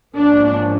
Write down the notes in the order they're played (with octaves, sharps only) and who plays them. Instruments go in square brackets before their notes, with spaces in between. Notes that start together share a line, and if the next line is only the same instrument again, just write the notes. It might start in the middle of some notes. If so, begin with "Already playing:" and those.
[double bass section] G#1 G#2 F3 A#3 C#4 [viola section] D4